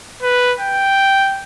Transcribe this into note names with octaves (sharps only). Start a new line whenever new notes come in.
B4
G5